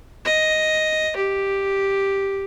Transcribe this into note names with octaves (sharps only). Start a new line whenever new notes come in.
D#5
G4